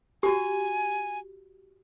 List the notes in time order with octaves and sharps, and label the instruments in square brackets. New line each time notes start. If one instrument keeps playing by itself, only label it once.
[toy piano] F#4 G4 [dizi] G#5